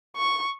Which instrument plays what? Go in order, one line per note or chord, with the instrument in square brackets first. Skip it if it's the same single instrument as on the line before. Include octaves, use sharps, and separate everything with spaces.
[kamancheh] C#6